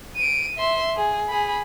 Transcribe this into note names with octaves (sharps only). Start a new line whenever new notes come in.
D7 D#7
E5 C6
G#4
G#4 B5